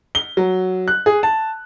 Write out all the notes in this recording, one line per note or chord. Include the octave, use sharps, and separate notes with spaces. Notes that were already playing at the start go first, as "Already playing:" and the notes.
G7
F#3
F#6
G#4
A5